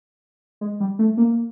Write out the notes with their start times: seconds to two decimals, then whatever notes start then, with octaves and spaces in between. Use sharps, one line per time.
0.61 G#3
0.80 G3
0.99 A3
1.17 A#3